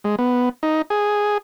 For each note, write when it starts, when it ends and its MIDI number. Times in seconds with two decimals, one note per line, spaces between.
0.04 0.15 56
0.19 0.49 59
0.63 0.82 63
0.90 1.38 68